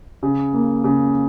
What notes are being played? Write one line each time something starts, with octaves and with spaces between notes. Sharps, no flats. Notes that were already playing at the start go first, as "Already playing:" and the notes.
C#3
A#3
C#3